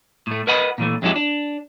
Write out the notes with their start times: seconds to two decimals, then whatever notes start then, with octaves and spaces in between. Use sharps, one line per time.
0.27 A2 A3
0.47 A#4 B4 D#5 F#5 G#5 B5
0.78 A#2 E3 A3
1.02 F2 F#3 G#3 B3 E4 G4
1.16 D4